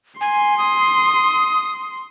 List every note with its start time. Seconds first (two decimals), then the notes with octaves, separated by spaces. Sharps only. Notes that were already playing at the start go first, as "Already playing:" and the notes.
0.21 G#5 C6
0.58 D#6